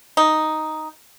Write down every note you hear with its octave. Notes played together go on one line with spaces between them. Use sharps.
D#4